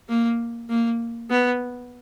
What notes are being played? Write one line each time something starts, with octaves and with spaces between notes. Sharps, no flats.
A#3
A#3
B3